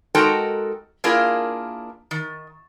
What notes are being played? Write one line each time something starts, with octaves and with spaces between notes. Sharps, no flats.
G#3 D#4 F#4 A4 A#4 G5
A#3 D4 E4 F4 G#4 A#4
D#3